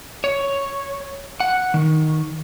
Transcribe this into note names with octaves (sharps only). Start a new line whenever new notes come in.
C#5
F#5
D#3